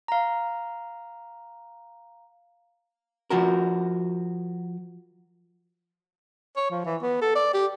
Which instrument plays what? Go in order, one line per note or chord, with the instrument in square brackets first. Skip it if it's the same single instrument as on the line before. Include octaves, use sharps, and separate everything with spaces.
[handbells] F5 A#5
[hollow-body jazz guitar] F3 F#4 A#4
[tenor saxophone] C#5
F3
E3
B3
A4
D5
G4